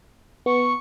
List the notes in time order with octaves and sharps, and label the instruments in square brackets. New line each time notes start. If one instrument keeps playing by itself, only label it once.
[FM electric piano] B3 [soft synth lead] C#6